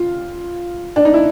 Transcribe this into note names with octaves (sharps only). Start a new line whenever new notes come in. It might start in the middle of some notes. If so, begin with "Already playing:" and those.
Already playing: F4
D4
D#4
E4